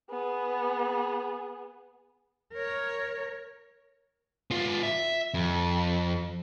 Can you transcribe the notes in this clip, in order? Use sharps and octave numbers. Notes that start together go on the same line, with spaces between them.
B3 G#4
A#4 C#5
B3 F4
E5
F2